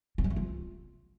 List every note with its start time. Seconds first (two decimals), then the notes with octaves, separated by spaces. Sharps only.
0.18 C4
0.24 G#3
0.30 A3
0.36 F4